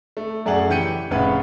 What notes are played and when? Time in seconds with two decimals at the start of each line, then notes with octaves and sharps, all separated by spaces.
0.17 A3
0.46 F#2 A3 G#4 D5 F#5 F#7
0.70 E3 G4 G5 G6 C#7 D#7
1.11 F1 A2 C#3 B4 F#5